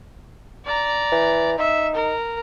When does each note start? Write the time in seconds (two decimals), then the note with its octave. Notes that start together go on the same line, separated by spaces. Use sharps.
0.65 D5 A#5
1.12 E3
1.58 D#4 E5
1.95 A#4